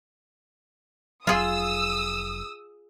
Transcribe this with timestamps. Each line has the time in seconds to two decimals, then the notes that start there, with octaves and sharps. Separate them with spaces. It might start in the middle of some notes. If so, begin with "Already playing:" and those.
1.27 F1 F#3 F4 G#4 D#6 E6